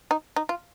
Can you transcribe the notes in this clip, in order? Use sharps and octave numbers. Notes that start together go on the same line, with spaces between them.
D#4
D#4
F4